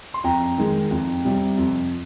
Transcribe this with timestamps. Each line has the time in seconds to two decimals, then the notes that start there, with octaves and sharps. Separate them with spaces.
0.14 C6
0.24 F2 G5 A#5
0.58 D#3 G#3
0.91 F2
1.25 C3 G3
1.58 F2